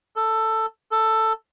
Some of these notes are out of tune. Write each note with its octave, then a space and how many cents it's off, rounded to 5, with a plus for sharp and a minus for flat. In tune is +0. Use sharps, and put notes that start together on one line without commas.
A4 +10
A4 +10